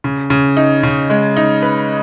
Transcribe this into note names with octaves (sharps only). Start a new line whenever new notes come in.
C#3
C#3
D#4
C#3
G#3
D#4
B4